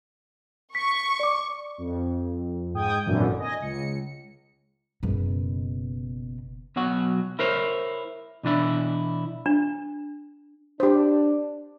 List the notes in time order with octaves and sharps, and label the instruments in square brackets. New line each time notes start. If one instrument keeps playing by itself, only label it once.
[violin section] C#6 [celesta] B6
[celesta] D5 D6
[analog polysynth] F2
G#2 G5 D#6 G6 G#6
G#1 F#2 A#2 D3 E3
D#5 G#5 A#6
C#2 C#7
[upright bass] F#1 B2
[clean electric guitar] B1 B2 F#3 F#4
E4 A#4 C5 C#5
B2 E3 D4 E4
[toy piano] D4
[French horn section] D4 [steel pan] G4 C5